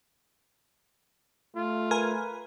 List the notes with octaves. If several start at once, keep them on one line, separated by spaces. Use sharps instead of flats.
A3 F4
A#4 B4 G#5